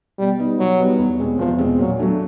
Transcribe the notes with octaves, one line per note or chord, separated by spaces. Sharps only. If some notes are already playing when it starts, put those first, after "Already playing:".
B2 G3
G3 B3 D#4
B2 F#3
G3 B3 D#4
E2
B2 G#3 C4
E2 F3
B2 G#3 C4
A#2 F#3
F#3 A3 D4